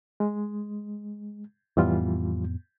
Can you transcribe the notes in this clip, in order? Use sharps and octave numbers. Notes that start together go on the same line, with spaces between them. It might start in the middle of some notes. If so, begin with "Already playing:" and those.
G#3
F2 A2 E3 G3 B3 F4